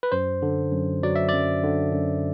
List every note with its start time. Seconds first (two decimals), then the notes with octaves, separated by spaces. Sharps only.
0.03 B4
0.12 F#2 C5
0.42 D3
0.72 F#2
1.03 F#3 D5
1.16 E5
1.29 F#2 D5
1.63 D3
1.93 F#2